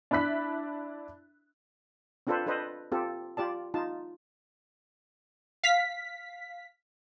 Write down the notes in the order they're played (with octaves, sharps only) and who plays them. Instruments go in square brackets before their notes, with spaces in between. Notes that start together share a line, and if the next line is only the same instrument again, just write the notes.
[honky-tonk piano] D4 E4 B5 F#6 B6
[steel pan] C4 D4 F4 A4 B4 C5
D4 A4 B4 C5 D#5
C4 F4 G4 A4
F4 G4 D5 A5
D#4 F4 A5
[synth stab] F5 B6